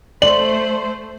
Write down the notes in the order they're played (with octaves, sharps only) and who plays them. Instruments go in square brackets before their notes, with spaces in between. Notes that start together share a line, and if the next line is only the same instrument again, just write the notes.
[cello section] A3 C5 [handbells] D5 [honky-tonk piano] F#7